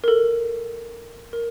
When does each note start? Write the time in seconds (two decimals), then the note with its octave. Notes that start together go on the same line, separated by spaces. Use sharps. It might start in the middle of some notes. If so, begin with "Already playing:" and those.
0.04 A#4
0.08 A4
1.33 A#4